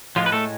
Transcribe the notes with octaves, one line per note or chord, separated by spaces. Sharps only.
A2 F3 G#3 F4
B4
A3 A4